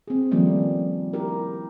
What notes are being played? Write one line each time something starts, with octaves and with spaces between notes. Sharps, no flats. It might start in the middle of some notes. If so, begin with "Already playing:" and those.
C4 G#4
D#3 F3 G3 A3 A#3 C#4
E4 G4 A#4